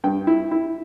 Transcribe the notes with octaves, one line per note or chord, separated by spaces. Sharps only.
G2 G5
E4
E4